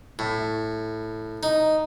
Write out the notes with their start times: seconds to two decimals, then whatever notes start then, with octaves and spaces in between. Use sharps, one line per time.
0.19 A2
1.43 D#4